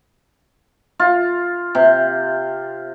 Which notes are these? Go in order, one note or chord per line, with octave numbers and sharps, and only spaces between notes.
F4
C3